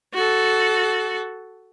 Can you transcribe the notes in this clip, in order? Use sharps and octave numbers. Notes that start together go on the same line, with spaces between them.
F#4 A4